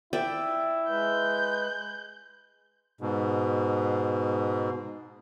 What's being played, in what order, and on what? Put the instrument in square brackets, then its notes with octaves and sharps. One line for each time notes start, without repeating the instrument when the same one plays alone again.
[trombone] E4 [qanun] D5 E5 G5
[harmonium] G#3 B4 [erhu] G6
[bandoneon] G#2 B2